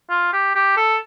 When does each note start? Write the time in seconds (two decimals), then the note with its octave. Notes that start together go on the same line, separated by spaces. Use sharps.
0.10 F4
0.33 G4
0.55 G4
0.77 A4